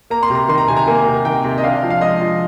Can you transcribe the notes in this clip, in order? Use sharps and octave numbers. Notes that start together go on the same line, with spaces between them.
A#3 A#5
C6
C3
A#5
D#3 C6
A#5
C3 G#5
A#5
A#3 G#5
C3
D#3 G5
C3
D#5
D4 F5
F3
F5
G#3 D#5
F3